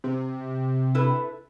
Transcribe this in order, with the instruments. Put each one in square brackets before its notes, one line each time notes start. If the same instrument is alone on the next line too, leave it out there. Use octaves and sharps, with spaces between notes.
[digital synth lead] C3
[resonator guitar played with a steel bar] E4 A4 B4